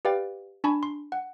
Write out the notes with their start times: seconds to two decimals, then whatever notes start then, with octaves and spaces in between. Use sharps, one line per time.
0.05 G4 B4 D5 F5 G5 A6
0.64 D4 G#5 A5 B5 C#6
0.83 C6
1.12 F#5